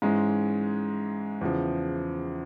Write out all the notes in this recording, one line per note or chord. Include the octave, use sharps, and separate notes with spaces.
G#2 E3 G#3 C#4
E2 C#3 F3